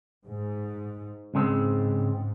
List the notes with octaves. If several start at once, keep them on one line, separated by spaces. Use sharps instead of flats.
G#2
C#2 G#2 C#3 G#3 C4